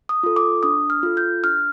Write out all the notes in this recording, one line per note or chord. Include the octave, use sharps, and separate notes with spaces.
D#6
F4 A4
D6
D4 D#6
F6
F4 A4
G6
D4 F6